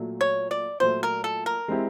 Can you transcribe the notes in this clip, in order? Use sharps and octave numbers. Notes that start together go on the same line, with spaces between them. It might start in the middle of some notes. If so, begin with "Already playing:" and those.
Already playing: A#2 F#3 A3
C#5
D5
A#2 F#3 A3 C5
A#4
A4
A#4
G#3 C4 E4 G4